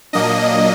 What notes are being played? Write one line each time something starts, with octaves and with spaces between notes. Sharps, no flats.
A#2 F#3 A#3 D4 D#5